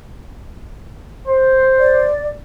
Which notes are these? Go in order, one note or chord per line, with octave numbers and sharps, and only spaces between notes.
C5
D5